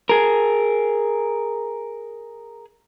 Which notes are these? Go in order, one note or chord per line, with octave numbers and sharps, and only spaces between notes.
G#4 A#4